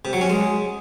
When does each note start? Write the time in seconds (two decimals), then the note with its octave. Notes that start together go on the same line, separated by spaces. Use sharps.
0.05 C3
0.13 F#3
0.21 C#4
0.30 G#3